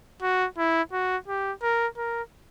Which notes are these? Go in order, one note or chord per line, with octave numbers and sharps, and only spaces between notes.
F#4
E4
F#4
G4
A#4
A#4